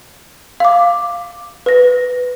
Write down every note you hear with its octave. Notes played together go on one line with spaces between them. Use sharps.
F5 D6
B4 A#6